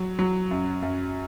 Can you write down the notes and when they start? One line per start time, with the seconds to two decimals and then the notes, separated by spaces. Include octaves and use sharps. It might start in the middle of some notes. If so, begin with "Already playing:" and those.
Already playing: F#3
0.19 F#3
0.51 F#2
0.82 F#2